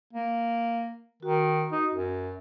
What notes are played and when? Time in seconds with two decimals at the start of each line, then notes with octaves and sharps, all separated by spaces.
0.13 A#3
1.23 D#3 F#4
1.72 D#4
1.95 F#2